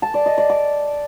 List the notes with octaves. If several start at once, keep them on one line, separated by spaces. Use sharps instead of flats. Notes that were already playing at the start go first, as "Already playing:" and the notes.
A5
D5
D#5
D5
D6